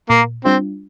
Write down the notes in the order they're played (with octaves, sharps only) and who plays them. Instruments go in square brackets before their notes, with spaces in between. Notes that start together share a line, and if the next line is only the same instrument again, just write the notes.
[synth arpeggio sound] A#2 [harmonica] A#3
[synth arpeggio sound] G3 D4 F4 [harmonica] C4